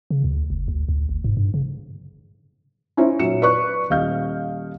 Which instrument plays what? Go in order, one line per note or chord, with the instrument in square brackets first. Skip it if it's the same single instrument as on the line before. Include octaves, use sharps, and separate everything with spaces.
[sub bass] C#3
D2
F#1
D2
D2
G1
G#2
G2
C#3
[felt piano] C#4 D#4 E4 C5
A#2 F#3 C#7 E7
B4 D5 C#6 F#6
D#1 D#5 F5 G6